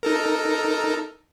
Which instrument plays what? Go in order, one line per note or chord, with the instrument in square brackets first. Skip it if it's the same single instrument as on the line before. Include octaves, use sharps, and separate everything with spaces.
[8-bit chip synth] D#4 A4 A#4